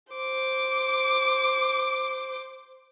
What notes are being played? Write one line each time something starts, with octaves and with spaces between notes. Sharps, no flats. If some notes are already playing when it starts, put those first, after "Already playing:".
C5 D6